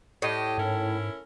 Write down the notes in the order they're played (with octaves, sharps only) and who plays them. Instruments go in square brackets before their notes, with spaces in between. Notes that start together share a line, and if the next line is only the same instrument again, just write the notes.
[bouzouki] A2 [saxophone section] G4 D#5
[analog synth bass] G#2 [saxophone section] C#4 E4 A#4